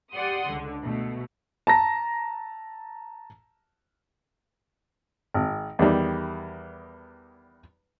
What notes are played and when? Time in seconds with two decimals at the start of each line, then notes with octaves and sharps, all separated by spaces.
0.14 G4 D5 F#5 C6 D#6
0.47 C#2 D3
0.83 B2 A3
1.67 A5 A#5 A#6
5.34 G#1
5.79 E2 D#3 G3